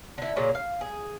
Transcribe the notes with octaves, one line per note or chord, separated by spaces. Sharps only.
D3 E4
A#2 C#3 F#3 A#3
F5
G#4